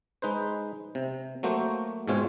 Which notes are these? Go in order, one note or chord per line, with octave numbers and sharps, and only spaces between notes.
G#3 D#4 B4 C5
C3
F#3 A3 A#3 F#4 C5
G#2 B2 G#3 C4 F4 C#5